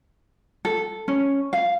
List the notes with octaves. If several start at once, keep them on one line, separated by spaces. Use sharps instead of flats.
A4
C#4
F5